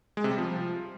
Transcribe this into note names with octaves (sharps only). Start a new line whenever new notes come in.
G#3
C3
G3
F3